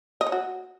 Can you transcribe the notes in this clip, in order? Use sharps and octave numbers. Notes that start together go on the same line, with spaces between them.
D#5
C#5
F#4